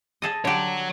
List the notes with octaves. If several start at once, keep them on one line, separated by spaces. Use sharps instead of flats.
G#4 A4 D#5
D3 G4 C#5 F#5